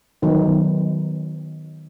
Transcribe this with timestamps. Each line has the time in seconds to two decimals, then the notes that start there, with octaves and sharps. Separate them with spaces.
0.22 D#3 F#3 B3 D#4